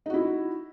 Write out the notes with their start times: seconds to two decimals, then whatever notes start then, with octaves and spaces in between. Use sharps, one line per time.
0.06 D#4
0.10 F#4
0.14 E4